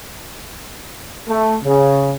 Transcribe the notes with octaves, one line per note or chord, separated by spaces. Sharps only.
A3
C#3